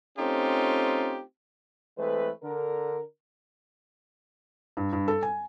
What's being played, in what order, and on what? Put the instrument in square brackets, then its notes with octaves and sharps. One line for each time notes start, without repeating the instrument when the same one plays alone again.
[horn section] A3 C4 C#4 D#4 F4 G4
[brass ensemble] E3 G#3 A3 C4 A4 B4
D3 A#4
[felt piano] G2
G2
A4
G#5